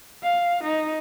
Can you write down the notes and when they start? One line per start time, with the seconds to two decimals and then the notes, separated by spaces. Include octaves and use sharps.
0.23 F5
0.63 D#4